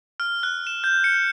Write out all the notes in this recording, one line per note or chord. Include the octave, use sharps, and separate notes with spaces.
F6
F#6
E7
G6
C#7